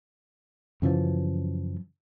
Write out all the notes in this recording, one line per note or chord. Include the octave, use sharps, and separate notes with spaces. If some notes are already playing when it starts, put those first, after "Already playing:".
F#2 C#3 E3 F3